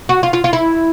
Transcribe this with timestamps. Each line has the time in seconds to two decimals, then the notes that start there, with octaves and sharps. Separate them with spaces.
0.09 F#4
0.23 F4
0.33 F4
0.44 F4
0.53 E4